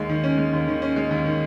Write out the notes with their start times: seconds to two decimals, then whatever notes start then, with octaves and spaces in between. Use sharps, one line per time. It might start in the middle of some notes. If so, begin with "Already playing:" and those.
Already playing: D#2 G#3
0.09 D#3
0.24 C#4
0.38 G#3
0.53 D#2
0.68 D#3
0.82 C#4
0.96 G#3
1.11 D#2
1.25 D#3